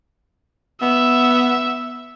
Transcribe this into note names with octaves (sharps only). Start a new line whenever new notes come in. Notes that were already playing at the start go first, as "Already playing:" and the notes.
B3 E5